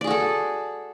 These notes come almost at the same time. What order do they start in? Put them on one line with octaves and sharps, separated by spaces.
D5 G#4 F#4 A4